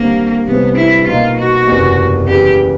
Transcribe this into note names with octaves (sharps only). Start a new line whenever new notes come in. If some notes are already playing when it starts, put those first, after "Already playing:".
Already playing: D#2 D3 G3 A#3 C4
C2 C3 E3 A3 B3 C4
E4
B2 F#3 A#3 D#4 F4
F#4
F#1 E2 C3 E3
E2 C#3 E3 G4